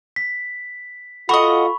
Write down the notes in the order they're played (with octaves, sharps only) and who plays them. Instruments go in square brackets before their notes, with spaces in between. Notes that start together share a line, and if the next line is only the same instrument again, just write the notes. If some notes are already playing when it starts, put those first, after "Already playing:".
[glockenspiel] B6
[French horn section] F4 A4 [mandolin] F#4 D#5 [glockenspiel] B5 C#6